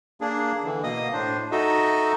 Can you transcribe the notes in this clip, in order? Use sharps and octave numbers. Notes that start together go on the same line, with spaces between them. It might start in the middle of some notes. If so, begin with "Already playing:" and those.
A#3 D4 G#4
D3 E3
B2 A#3 D#5 D#6
A2 D4 C5
D#4 F#4 A4 D#5 E5